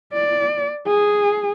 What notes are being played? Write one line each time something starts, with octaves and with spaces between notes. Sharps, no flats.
D5
G#4